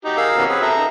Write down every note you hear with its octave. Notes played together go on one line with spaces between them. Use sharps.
D#4 F#4 G4
G#4 A#4 F5 E6
C3 E3 B3 C#4 F#4
C4 G#4 B4 E6
A4 E5 A#5
D#4